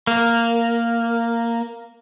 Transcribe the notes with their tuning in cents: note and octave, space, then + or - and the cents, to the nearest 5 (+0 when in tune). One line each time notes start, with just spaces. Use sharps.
A#3 -5